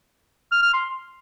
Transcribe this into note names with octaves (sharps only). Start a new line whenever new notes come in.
F6
F6
C6